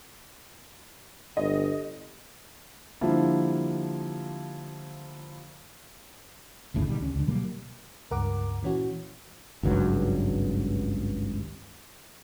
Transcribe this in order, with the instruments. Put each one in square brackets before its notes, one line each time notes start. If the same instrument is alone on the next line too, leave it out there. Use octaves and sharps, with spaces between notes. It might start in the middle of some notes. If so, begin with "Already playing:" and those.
[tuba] G1 [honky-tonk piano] D#5
[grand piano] D3 F3 G3 A#3 E4 F4
[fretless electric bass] G1 D2 A2 C#3
B2 D#3 G3
C#2 C#4
C#2 D3
B2 F#3 G3 A#3
[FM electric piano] C#2 G2 A#4 F#5 D6
A#2 E3 C#4 F#4
[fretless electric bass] G#1 C#2 G2 F#3